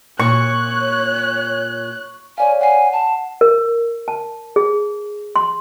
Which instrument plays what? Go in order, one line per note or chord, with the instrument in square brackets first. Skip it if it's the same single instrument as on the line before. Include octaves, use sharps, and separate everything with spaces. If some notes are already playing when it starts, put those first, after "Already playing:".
[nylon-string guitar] A#2 [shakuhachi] C#5 [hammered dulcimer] C#6 [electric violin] F#6
[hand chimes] C#5 D5 F5 [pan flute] G#5
[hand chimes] F#5 C7 [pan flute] G#5
[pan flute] A5
[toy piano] A#4
A5
G#4
C6